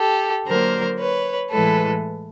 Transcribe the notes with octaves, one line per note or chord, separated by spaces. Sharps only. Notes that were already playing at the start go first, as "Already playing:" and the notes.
Already playing: G4 A4
D3 F#3 A#3 A#4 C5
B4 C#5
A2 E3 G#3 A4 B4